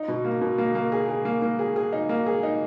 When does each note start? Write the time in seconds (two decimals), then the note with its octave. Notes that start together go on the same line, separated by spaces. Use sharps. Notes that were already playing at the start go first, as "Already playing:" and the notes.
Already playing: D#4
0.08 B2
0.25 A#3
0.41 B2
0.58 A#3
0.75 A#3
0.92 G#4
1.09 G#4
1.25 A#3
1.42 A#3
1.59 G#4
1.76 G#4
1.93 D#4
2.09 A#3
2.26 G#4
2.43 D#4